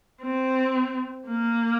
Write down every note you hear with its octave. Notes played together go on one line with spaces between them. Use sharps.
C4
A#3